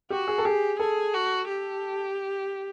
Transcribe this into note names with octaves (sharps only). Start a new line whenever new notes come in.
F#4 G4
G#4
A4
G4 G#4
G#4 A4
F#4
G4